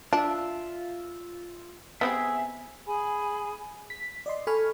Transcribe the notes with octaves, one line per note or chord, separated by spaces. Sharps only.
D4 F4 E5
B3 C4 G4 G#4 E5
G#4 G#5 B5
B6
D5 D#5 C6
A4 G#5 B5 C#6 F6